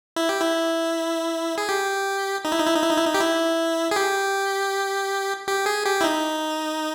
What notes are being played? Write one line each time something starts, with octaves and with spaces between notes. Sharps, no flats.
E4
G4
E4
G#4
G4
D#4
E4
D#4
E4
D#4
E4
D#4
E4
D#4
G4
E4
G#4
G4
G4
G#4
G4
E4
D#4